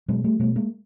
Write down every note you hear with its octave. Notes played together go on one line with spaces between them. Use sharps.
B2 F#3 G#3
G3 A3
B2 G3 A3
G#3 A#3